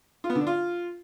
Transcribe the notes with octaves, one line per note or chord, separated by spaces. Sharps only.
F4
B3
D3
D4
F4